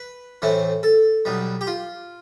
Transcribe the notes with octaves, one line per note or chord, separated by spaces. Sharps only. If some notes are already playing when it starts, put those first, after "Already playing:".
Already playing: B4
A2 E3 A3 C4
A4
B1 B2 G3
G4
F4